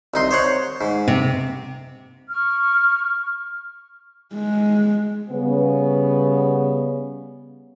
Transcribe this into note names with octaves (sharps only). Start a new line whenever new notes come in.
C2 D#4 C6
C5 C#5 F#5
G#2
C3
C#6 F6
G#3
C#3 G3 B3